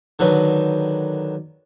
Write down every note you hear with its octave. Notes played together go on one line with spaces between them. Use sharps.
D3 D#3 F#3 B4